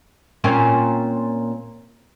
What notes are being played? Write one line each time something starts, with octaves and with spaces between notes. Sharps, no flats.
A#2 C4 C#4